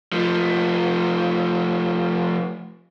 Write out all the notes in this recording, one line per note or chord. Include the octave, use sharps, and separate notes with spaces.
F3 A3